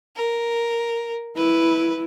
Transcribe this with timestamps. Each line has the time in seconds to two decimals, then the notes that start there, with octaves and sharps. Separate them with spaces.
0.16 A#4
1.37 E4 B4